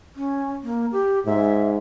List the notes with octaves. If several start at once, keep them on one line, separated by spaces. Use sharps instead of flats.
C#4
A#3
G4
G#2 E5